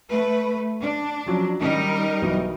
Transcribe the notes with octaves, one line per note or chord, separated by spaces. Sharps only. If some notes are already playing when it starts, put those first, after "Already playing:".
A3 B4
D4
F3 F#3 C#4
D#3 G3 C#4 D#4 A#4
B1 E3 F#3